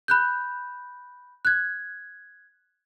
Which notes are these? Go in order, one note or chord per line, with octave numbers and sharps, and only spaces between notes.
B5 F#6 G6
F#6 G#6